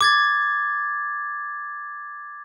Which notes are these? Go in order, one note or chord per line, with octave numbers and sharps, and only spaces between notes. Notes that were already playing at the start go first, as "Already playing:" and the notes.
D6 G#6 A6